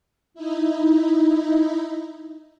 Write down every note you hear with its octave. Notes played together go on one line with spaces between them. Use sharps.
D#4 E4